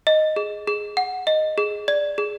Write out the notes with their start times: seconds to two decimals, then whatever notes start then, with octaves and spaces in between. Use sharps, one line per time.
0.07 D#5
0.36 G#4
0.67 G#4
0.97 F#5
1.27 D#5
1.58 G#4
1.88 D5
2.18 G#4